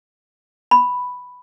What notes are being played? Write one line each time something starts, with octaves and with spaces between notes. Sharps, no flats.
B5